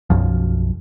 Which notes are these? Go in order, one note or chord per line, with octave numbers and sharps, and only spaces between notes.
B1 F#2 F3